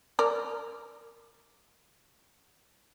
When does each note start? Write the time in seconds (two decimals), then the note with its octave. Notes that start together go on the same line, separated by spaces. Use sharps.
0.19 A#4 D5